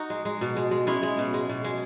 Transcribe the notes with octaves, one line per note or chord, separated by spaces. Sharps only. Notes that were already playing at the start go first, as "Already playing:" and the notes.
Already playing: D#4 F#4
G#3
G#3
B2
G#3
G#3
G#3 C#4 E4
G#3
B2
G#3
B2
G#3